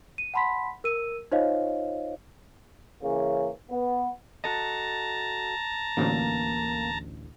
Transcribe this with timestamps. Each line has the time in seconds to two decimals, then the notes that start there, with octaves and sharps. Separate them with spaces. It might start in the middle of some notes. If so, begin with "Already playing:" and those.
0.18 D#7
0.34 F#5 A5 B5 C6 B6
0.84 A#4 E6 D#7
1.32 D#4 F4 C5 C#5 D#5 F5
3.03 C#3 E3 A#3 C#4
3.71 B3
4.44 F#4 A4 D#5 A5 A#5
5.97 A1 D2 A#3